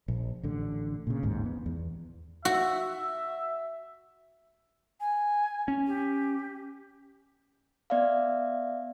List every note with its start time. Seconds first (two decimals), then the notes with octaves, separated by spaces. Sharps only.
0.08 A#1
0.43 A1 D3
1.07 A#2 C#3
1.23 A1 D#2 G#2
1.45 B3
1.66 E2
2.45 F#4 E5
5.00 G#5
5.68 C#4
5.87 G4
7.90 B3 D5 E5 F5